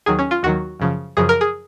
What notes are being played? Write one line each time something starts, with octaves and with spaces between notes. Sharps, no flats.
D#2 D#3 F#3 G#4
C#4
F4
D#2 D#3 F#3 F#4
F#2 C#3 F3
F#2 C#3 F3 G#4
A#4
G#4